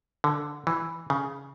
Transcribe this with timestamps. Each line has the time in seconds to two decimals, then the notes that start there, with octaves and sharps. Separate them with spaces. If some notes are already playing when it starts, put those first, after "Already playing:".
0.24 D3
0.67 E3
1.10 C#3